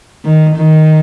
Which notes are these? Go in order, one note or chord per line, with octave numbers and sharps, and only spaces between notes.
D#3
D#3